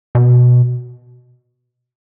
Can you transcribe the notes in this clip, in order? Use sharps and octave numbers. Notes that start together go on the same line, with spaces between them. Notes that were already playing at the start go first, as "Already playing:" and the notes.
B2